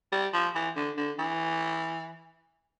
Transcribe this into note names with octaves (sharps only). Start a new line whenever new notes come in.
G3
F3
E3
D3
D3
E3